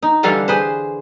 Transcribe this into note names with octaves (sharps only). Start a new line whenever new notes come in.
D#4
D3 E3 G3 D4 A4 F5
G#4 B4 C5